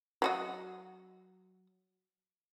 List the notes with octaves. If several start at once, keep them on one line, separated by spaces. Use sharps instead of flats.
F#3 F#4 D#5